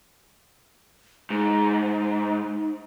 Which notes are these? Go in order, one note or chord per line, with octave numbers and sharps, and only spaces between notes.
G#2 D#4